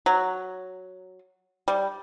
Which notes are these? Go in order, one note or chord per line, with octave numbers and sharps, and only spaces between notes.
F#3
G3